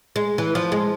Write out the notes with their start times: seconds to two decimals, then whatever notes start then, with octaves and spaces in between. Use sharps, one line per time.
0.16 G#3
0.38 E3
0.55 F3
0.72 G#3